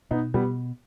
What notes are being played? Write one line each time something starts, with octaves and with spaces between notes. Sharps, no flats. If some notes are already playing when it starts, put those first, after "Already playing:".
B2 B3 D#4
B2 G3 B3